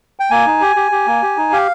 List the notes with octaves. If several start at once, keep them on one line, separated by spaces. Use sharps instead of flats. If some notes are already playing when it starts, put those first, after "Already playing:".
G5
A#3 G#5
D#4
G4
G4
G4
A#3
G4
D#4
G4 F5